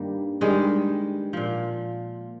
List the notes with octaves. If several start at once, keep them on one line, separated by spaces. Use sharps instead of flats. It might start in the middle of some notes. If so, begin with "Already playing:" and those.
Already playing: G2 D#3 G3 A#3
G2 D#3 G3 G#3
A#2 F3